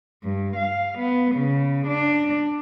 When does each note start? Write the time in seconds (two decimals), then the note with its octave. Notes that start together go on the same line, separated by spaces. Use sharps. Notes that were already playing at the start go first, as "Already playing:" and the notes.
0.23 G2
0.56 F5
0.98 B3
1.35 C#3
1.87 D4